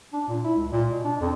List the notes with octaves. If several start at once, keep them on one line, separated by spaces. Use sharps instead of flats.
D4
A#2
E4
C#2
A#2
B2
D4
F2